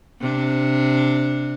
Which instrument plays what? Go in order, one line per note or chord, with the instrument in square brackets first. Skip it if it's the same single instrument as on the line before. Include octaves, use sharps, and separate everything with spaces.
[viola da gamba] C3 D4